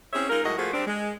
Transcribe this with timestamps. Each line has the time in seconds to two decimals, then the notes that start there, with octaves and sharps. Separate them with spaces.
0.13 C4 C#4 E4 G#4 C#5 E5
0.29 G#3 D#4 F4 A#4
0.44 A2 F#3 G#3 F#4 A#4 D#5
0.58 F3 A3 A#3 F#4 G#4 C5
0.73 G3 C4 D4
0.87 G#3